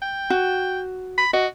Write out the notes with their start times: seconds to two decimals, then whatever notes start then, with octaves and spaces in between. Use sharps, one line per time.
0.02 G5
0.30 F#4
1.18 B5
1.33 F#4 D#5